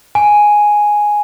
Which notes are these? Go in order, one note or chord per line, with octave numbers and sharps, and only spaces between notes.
G#5